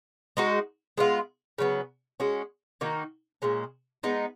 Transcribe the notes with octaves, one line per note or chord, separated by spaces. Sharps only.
G#3 D#4 F#4
G#3 B3 F4
C#3 F#3 B3
G#3 C#4 F#4
D#3 A#3 D#4 F#4
A#2 G#3 C#4
G#3 B3 D#4